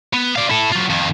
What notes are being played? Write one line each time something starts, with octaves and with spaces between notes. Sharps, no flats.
B3
D5 F5
E4 A4
F#3 F4
F2 D#3